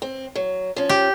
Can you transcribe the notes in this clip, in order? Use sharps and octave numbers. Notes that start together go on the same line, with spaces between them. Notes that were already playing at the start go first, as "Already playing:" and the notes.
C4
F#3
F3 C#4
G4